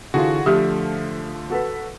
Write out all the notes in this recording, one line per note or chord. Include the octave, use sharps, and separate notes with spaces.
D3 E3 F4 F#4 G#4
D3 F3 A3 G4 E5 F6
F#4 A4 B4